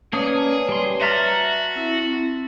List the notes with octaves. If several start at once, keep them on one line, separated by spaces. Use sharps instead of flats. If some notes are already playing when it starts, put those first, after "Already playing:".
A#3 C#4 G#4 B4 C#5 D5 A5 D#6
G3 C6
F#4 E5 A#5 F6 A6 B6 E7
C4 E4